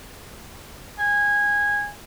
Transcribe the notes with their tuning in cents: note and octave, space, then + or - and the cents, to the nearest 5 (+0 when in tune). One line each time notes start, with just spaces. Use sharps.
G#5 -15